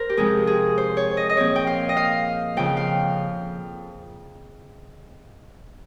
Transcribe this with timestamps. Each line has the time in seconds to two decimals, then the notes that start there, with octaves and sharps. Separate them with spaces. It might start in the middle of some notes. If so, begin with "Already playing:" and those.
Already playing: A#4 C5
0.09 G4
0.17 F2 C3 F3 G#3 C4 G#4
0.47 G#4
0.78 C5
0.97 C#5
1.17 D#5
1.30 D#5
1.37 A#2 F3 C4 C#5
1.56 G5
1.67 F5
1.89 D#5
1.97 F5
2.57 F2 C#3 F3 G5
2.77 F5